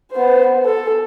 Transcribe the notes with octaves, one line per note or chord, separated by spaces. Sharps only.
B3 C5
A4